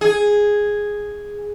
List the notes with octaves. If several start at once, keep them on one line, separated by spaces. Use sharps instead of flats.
G#4